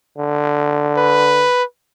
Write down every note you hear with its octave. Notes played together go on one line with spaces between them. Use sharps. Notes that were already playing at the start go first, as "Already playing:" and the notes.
D3
B4